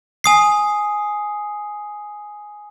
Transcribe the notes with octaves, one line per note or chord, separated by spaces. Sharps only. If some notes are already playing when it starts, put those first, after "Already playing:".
G#5 D#6 C7